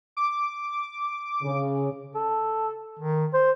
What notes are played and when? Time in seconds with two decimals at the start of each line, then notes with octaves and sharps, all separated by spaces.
0.17 D6
1.43 C#3
2.15 A4
2.99 D#3
3.34 C5